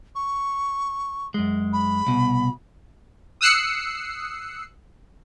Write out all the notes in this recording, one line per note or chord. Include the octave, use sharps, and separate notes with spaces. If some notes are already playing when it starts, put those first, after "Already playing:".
C#6
F#2 G#3
B5
C2 B2
D#6 E6 F#6 C7 C#7